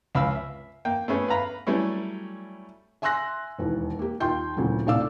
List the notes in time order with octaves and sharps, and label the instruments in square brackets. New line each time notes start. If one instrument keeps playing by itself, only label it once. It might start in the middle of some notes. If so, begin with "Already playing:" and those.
[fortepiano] C#2 F5 B5 E6
E5
A#3 G5
A3 B3 C#4 G#4
B4 F5 A#5 B5
F#3 G3 A3 C#4 E4
[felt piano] E5 G#5 C6 E6 F#6 A#6
E1 D#2 E3
A#3 G4
D#2 F4 G5 C6 G6
D2 A#2 C#3 E3 F#3
A2 C3 D4 F5 D6 E6